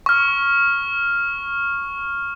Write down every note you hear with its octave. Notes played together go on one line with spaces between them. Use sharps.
C#6 F6